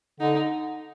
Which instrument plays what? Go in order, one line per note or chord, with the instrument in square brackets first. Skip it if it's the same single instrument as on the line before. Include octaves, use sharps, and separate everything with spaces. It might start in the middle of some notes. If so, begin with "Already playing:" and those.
[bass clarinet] D3 [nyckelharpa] D#4